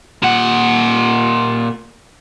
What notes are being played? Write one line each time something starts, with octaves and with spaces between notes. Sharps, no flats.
A#2 F#5